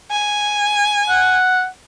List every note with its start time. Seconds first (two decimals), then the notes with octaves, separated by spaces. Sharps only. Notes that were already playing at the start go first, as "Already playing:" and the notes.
0.11 G#5
1.09 F#5